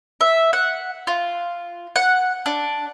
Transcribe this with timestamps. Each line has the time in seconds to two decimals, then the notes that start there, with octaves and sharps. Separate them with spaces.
0.21 E5
0.53 F#5
1.07 F4
1.96 F#5
2.46 D4